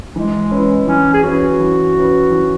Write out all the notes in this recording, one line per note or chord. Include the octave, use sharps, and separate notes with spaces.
E3 G#3
C#4 E4 B4
E3 C#4
G#4
C#4 E4 F#4 B4
E3
C#4 E4 B4
E3